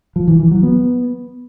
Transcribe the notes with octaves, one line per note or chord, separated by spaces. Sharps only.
F3
E3
E3
F#3
B3